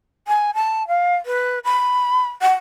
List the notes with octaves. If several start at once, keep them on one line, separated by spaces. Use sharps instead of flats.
G#5
A5
F5
B4
B5
F#5